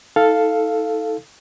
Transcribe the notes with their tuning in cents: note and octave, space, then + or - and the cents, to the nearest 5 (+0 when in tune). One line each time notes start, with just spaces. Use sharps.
D#4 +40 A4 +0 F5 +0